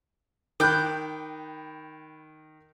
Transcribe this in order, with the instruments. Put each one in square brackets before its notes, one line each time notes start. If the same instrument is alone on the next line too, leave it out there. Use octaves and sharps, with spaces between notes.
[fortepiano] D#3 F#6 [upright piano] G5 B5 [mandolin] D6 G6